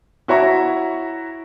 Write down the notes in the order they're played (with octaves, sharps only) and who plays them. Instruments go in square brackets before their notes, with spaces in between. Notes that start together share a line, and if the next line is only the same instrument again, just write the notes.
[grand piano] E4 F#4 C#5 E5 A#5 C#6